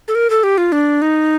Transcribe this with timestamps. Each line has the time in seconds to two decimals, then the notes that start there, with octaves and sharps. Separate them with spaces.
0.08 A4
0.15 A#4
0.30 A4
0.43 G4
0.58 F4
0.72 D4
1.02 D#4